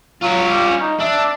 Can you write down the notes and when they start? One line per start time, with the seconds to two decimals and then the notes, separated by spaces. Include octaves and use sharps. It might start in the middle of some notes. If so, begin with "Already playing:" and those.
0.22 F#3 F4 C#5
0.49 G3
0.66 C#4
0.81 D#4
1.00 D4 E5